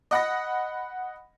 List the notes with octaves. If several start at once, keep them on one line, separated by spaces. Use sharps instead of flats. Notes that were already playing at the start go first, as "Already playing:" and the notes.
D#5 F#5 B5 A#6